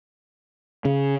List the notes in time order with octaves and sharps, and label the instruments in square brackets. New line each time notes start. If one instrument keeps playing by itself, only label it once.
[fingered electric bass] C#3